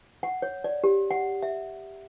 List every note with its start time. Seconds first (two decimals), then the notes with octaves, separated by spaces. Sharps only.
0.23 F#5
0.42 C#5
0.64 D5
0.84 G4
1.11 F#5
1.42 E5